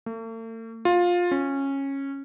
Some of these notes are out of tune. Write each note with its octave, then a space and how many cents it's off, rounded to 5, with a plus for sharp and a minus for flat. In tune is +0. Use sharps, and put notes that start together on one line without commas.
A3 +45
F4 +15
C#4 -15